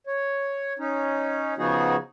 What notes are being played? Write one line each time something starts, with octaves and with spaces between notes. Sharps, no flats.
C#5
C#4 D#4
C#3 F3 B3 D#4 F#4 G#4